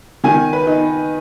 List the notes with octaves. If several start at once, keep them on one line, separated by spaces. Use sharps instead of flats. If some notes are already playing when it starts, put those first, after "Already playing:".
D#3 G#5
B4
D#4